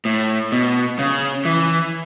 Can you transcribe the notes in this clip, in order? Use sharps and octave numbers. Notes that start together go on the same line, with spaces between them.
A2
B2
C#3
E3